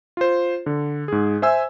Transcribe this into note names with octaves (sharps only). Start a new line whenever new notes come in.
F4 C5
D3
G#2 G#4
C5 E5 G#5 E6